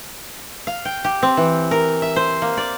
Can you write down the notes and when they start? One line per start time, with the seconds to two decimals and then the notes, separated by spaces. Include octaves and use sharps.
0.67 F5
0.85 G5
1.04 G4
1.23 C4
1.37 E3
1.71 A#4
2.02 E5
2.16 C5
2.42 A#3
2.57 D5